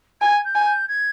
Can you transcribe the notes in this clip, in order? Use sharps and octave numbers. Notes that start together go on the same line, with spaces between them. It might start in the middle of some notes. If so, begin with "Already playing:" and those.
G#5 G#6
G6
G#5
G6
G#6